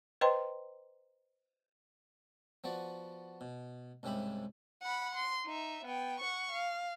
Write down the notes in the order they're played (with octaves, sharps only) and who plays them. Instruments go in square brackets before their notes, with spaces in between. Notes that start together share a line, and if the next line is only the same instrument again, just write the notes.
[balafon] B4 C5 D#5 G5 A#5 C6
[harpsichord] F3 B3 F#4 B4 D5
B2
C2 G#2 C#3 G4 E5 B5
[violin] F#5 B5
C6
D#4 E5
B3 G5
F#5 C#6
F5